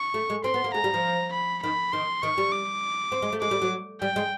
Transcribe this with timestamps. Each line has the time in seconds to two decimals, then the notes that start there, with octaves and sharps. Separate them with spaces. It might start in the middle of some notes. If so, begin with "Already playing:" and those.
Already playing: C#6
0.14 A3
0.30 G#3
0.44 C4 C6
0.54 B3
0.64 A#3
0.74 G#3 A#5
0.84 G3
0.94 F3
1.33 B5
1.63 D#3 B5
1.93 D#3 C6
2.23 D#3 C#6
2.38 G3
2.52 D6
3.12 C4
3.22 G#3
3.33 A3
3.41 G#3 D6
3.51 G3
3.62 F#3
4.02 G3 G5
4.16 G#3